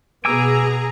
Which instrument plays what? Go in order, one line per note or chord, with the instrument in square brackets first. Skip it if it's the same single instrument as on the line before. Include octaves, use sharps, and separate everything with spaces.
[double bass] B2 B3 [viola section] G#4 A#5 [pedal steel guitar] G#5 D6 E6